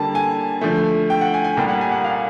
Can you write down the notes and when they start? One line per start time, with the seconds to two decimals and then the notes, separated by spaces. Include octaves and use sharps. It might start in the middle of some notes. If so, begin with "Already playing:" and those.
Already playing: D3 G3 A#3 A5
0.15 G#5
0.61 D3 F3 A3
1.10 G5
1.21 F#5
1.34 G#5
1.45 G#5
1.57 C2 A#2 G3 A#3 G5
1.68 F#5
1.81 G#5
1.92 F#5
2.04 F5